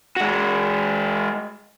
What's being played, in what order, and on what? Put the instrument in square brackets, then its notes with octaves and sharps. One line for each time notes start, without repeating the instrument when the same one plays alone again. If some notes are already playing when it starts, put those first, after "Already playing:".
[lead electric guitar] G#3 F#4